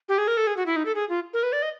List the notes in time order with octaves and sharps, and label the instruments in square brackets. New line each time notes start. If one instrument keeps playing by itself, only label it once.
[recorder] G4
G#4
A#4
A4
G#4
F#4
E4
D#4
A4
G#4
F4
A#4
B4
D5
D#5